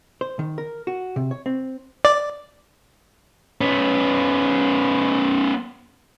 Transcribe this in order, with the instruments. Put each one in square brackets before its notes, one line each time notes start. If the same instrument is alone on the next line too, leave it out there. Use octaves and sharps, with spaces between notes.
[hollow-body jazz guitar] C5
D#3
A#4
F#4
C3
C#5
C4
[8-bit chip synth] D5
[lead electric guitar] B3 C#4